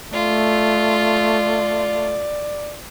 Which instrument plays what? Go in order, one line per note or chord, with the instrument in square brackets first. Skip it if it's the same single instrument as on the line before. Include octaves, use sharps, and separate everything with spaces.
[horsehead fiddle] A3 [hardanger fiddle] F4 [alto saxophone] D5